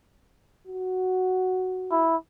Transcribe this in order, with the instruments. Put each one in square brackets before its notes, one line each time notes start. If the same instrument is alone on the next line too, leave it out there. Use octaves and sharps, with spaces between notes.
[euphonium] F#4
[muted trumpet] E4